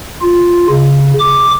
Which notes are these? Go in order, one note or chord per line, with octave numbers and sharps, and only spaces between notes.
F4
C#3
D6